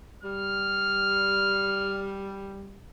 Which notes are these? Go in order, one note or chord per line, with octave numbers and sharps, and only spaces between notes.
G3 F6